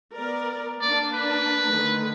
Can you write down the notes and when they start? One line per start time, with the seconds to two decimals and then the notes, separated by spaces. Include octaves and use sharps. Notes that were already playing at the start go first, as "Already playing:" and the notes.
0.17 B3 A#4 D5
0.80 A#3 D4 D5
1.14 B4
1.69 D3 D#3 A3